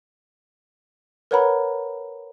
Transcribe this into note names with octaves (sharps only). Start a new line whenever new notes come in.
A#4 B4 C#5 F#5 A#5 B5